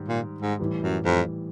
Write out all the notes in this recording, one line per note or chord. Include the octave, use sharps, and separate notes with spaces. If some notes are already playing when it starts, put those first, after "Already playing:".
Already playing: G#2 D#3 G3
A#2
G#2
A2 E3 G3
F#2
F2